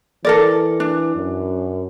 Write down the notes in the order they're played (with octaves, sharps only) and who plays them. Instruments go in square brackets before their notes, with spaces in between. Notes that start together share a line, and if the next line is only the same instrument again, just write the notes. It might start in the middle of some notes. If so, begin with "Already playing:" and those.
[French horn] E3 [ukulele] A4 A#4 D5
[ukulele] D4
[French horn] F#2